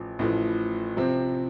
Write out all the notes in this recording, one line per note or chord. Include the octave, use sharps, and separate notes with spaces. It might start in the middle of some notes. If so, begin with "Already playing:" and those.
Already playing: A1 A2 F3
A1 A2 F3
C3 F3 C4